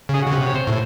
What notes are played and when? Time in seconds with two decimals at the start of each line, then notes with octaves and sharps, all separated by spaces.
0.09 C#3 G#4
0.22 C#3 F#4
0.32 C3
0.46 C#5
0.55 C5
0.67 A2